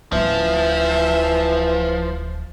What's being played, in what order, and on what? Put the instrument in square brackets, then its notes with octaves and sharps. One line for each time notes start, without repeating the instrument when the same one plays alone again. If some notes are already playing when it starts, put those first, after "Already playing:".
[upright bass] D1 C#4 [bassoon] E3 [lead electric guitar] F3 [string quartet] E5